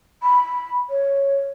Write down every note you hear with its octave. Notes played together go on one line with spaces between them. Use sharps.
B5
C#5